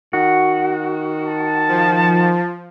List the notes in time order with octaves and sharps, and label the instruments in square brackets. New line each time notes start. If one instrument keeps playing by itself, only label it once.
[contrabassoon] D#3 [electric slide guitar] F#4
[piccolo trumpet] A5
[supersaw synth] F3